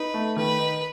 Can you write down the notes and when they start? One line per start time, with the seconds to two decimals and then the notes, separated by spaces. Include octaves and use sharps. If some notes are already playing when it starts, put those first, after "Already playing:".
Already playing: D#4 B4
0.14 A3
0.37 D#3 B4
0.59 D#4